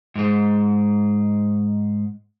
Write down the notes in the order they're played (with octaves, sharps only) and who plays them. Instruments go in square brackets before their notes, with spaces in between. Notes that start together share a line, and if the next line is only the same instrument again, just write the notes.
[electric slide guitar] G#2 G#3